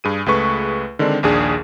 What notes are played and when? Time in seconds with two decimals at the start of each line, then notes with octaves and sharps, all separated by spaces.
0.04 G2 G#4 D#7
0.26 C#2 A3 G#4 B4 C#6
0.99 D3 D#3 G#3 C4 D4
1.23 A#1 D#2 D4 G#4